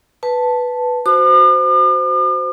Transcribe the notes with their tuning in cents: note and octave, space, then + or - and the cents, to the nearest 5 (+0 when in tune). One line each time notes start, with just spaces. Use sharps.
B4 +0 A5 +0
F#4 +0 C5 -15 D6 +45